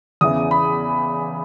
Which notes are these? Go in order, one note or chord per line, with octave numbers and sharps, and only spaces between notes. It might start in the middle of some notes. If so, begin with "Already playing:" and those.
E2 C#3 E3 D#6
B5